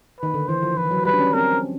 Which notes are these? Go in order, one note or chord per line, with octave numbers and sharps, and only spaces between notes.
D#3 B4
D3
E3 C5
F3
E3 B4
F#3
G3 B4
D4
C#4
C4 A#4